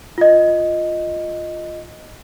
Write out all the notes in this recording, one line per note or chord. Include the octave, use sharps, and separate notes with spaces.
F4 D#5